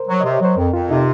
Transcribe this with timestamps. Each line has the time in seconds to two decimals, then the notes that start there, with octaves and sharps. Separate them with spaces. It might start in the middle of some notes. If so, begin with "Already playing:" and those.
Already playing: A#4 C5
0.08 F#3
0.20 C3 D#5
0.33 C#5
0.41 F#3 C5
0.57 F2 A#4
0.73 F2 F4
0.90 C3 D#4